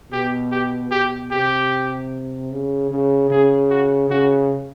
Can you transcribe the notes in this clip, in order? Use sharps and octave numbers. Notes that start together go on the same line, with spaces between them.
B2 G4
G4
B2 G4
C3 G4
C#3
C#3
C#3 G#4
F#4
C#3 F#4